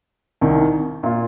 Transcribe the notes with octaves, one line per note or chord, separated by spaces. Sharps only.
C2 C3 D#3
A#2 A#3 F4